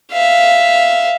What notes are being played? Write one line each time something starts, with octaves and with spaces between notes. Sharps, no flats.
E5 F5